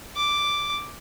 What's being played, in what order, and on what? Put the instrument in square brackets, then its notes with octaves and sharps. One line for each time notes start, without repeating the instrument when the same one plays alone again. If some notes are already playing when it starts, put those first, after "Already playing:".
[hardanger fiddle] D6